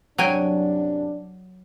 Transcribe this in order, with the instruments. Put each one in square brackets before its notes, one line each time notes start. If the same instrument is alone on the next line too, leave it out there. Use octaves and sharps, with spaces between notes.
[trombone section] C2 F#2 D4 [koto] F#3 G5 G#5